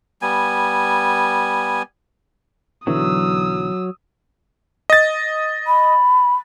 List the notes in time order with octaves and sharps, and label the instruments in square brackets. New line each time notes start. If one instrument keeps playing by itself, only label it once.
[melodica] G3 B3 G#5
[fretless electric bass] B1 D3 E3 [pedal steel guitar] F#3 [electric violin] D#6 E6
[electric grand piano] D#5 A6
[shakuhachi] B5